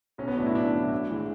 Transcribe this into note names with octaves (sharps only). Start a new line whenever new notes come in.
B1 C#4
B3
A2 F#3 A3 D4
E4
B1 D4
A2 F#3 A3
A1
A2 E3 G#3